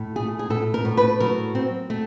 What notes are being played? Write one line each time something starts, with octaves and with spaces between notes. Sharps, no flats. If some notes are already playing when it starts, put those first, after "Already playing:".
Already playing: A2
A3 G#4
G#4
A2 A4
A#4
A2
B4
F#3 A#4
C4
A3